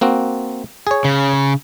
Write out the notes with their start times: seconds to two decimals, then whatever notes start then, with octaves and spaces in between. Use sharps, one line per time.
0.01 A#3 C4 F#4
0.87 G#4 C#5
1.04 C#3